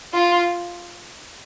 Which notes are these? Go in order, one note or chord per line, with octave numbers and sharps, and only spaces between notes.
F4